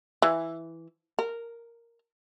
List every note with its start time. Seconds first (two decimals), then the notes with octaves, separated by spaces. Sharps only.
0.22 E3
1.19 A#4